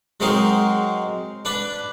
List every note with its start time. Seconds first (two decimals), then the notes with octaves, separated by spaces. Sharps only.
0.20 F#3 G#3 C4 D#4 A#4
1.45 D4 B4 B5